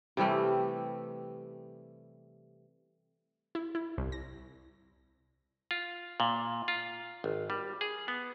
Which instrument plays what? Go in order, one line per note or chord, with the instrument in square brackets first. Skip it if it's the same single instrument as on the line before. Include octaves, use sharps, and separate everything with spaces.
[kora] C3 E3 G3 A3
[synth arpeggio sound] E4
E4
C2
A#6
[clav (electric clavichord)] F4
A#2
F4
G#1
G3
G#4
B3